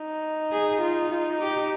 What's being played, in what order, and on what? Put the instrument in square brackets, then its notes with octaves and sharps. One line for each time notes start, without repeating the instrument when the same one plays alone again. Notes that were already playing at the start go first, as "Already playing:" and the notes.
Already playing: [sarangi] D#4
[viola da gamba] G#4
F4
F4
G4